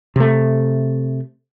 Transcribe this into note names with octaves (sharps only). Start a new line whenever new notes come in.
C3 A3